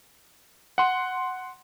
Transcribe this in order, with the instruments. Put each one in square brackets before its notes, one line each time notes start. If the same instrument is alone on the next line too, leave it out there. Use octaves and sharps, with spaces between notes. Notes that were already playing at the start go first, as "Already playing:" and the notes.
[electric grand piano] F#5 C6